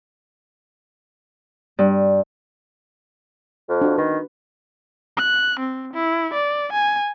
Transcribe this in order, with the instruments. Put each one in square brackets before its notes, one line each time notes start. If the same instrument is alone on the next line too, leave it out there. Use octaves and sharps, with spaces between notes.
[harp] G2
[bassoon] F2
[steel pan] D4 F#4
[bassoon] D#3 [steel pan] B4
[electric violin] F#6
C4
E4
D5
G#5